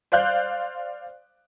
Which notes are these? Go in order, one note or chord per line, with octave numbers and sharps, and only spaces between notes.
C5 D5 F5 F#6 G6